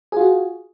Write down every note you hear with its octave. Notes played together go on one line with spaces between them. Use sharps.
F4 F#4 G#4